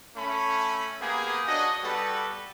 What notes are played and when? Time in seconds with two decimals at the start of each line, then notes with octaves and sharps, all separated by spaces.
0.17 A3 C#4 B5
1.01 A#3 B3 G4 G#4
1.48 D4 F#4 C#5 D#5
1.83 G3 B3 F#4 G4 A4 B4